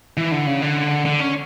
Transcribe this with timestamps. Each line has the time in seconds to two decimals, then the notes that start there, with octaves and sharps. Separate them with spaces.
0.17 E3
0.31 D3
0.47 C#3
0.62 D3
1.05 D3
1.20 C#4